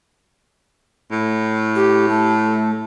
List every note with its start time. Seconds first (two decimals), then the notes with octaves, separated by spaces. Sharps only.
1.12 A2
1.76 G4
2.08 A3